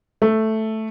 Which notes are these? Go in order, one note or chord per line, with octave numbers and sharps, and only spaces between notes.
A3